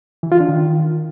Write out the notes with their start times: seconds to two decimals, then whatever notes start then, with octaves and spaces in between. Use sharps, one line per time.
0.23 E3
0.32 F4
0.40 D4
0.49 D#3